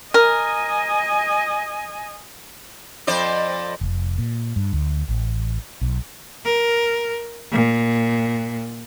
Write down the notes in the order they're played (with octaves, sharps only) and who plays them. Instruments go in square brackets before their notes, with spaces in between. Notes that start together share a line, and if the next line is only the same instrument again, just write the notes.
[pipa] A#4 [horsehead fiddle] D#5 G#5
[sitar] F2 C5 D5
[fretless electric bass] F1
A#2
G2
D2
A1
B1
[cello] A#4
A#2